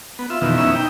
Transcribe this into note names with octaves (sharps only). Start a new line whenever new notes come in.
B3
F4 E5
F2 B2 D#3 E3
B3 C#4 D#4 E4 E5
D#4 G5